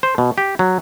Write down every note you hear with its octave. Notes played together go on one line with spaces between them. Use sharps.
C5
B2
G4
F#3